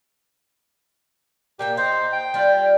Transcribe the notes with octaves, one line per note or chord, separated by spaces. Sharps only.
A#2 A#3 G4 G5
D#4 C5
G5
G3 F4